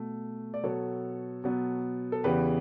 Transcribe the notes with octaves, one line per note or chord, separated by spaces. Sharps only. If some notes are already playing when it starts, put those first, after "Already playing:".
Already playing: B2 A3
D5
B2 F#3 B3 A4 C#5
B2 F#3 B3
A4
E2 C#3 E3 B3 G4 B4